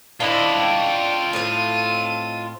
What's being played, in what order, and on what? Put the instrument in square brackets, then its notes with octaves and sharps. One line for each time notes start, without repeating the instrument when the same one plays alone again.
[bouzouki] D4 [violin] E4 C5 [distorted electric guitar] F4 D#5
[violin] G5
[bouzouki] A2 C4 [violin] A5 D#7